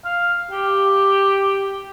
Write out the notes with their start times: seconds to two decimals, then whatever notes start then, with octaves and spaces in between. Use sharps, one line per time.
0.05 F5
0.51 G4